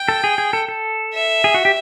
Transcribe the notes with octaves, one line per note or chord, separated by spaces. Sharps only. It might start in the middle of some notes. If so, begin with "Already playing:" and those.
Already playing: G5
A4
G#4
G#4
A4
A4
E5
G#4
F#4
G4